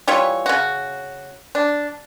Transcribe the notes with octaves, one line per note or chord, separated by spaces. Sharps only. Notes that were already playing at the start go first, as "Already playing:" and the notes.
E3 G3 F4 C#5
C#3 F#4
D4